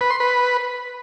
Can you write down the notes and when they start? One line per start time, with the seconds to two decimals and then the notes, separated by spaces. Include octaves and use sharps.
0.01 B4
0.10 C6
0.20 B4